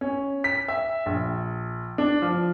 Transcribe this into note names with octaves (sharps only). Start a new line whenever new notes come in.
C#4
B6
E5
A#1
D4
F3